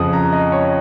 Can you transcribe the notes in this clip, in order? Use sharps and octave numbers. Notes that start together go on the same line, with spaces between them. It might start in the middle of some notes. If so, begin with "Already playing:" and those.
Already playing: F2 C#3 F3 D#6
A#5
D#5
C#5